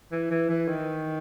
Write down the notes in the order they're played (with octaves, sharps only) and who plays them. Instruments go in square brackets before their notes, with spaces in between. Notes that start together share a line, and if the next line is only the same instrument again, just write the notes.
[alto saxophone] E3
E3
E3
D#3